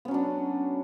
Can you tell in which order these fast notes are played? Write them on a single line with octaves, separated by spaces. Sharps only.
B3 C#4 F#3 D4